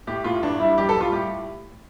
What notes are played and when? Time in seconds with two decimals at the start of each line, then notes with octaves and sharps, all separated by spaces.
0.07 A2 G4
0.24 A2 F4
0.42 A1 D4
0.60 G3 E4
0.78 G3 G4
0.89 A4
0.95 G3
1.01 F4
1.12 A2 G4